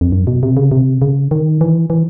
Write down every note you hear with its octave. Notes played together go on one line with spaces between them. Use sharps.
F2
F#2
B2
C3
C#3
C3
C#3
D#3
E3
E3